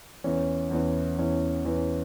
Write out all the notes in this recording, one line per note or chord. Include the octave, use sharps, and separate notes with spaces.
E2 E3 C#4
E2 E3 C#4
E2 E3 C#4
E2 E3 C#4